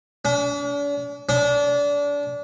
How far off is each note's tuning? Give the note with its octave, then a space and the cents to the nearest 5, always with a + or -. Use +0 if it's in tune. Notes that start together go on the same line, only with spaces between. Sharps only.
D4 -45
D4 -30